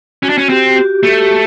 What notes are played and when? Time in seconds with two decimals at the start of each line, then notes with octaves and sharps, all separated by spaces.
0.23 C#4 F#4
0.29 D4
0.38 C#4
0.49 C4 G4
0.73 F#4
0.76 G4
1.03 A3 G4